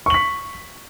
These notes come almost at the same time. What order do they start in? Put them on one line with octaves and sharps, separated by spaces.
C#6 F#7 B6